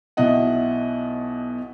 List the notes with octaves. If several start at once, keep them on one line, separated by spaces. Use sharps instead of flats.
B1 B2 E4 D#5 F#5